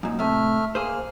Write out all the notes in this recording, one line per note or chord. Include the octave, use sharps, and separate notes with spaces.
F#2 A#2 D#4
A2 C3 A3 E5 F6
A#3 G#4 C5 F6